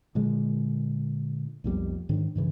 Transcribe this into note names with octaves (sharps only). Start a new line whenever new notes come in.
A#2 D3 G#3
B1 F2 G3 A#3
G#2 D#3 D4
G2 C#3 E3